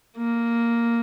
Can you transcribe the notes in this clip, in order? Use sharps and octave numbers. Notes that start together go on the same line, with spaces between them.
A#3